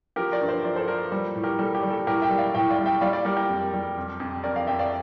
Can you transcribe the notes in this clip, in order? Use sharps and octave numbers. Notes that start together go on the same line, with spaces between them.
F3 G4 A#4
A#4 D5
G2
C5 E5
F3 A#4 D5
A4 C5
F3 A#4 D5
G3
A2
G4 A#4
G3 A4
G4
G3
A4
A2 G4 A#4
E5 G5
G3
D5 F5
A2 E5 G5
D5 F5
G3
E5 G5
G3 D5 F5
D5 F5
G3 G4 A#4
G4 A#4
F2
G3
F2
F2
F2 A#4 D5
D5 F5
F2 E5 G5
D5 F5